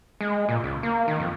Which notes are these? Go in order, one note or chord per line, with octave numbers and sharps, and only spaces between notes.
G#3
A#2
C#2
A#3
D#3
F2